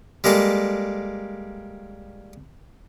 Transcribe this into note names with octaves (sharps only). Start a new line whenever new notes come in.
G3 G#3 A#3 A4